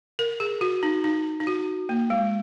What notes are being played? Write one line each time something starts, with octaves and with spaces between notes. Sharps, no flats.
A#4
G#4
F#4
D#4
D#4
D#4
F#4
A#3
G#3